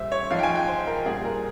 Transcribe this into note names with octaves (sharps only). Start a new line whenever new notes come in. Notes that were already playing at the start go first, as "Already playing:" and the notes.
Already playing: A#2 G3 C5 E5
C#5
G#2 F3 F5
G5
G#5
G5
C5
A#4
A#2 G3 G#4
A#4